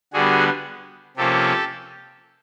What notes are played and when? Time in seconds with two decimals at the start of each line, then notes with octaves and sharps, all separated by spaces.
0.13 D3 G3 B3 F#4 G#4
1.16 C3 F3 A#3 C#4 G4 A4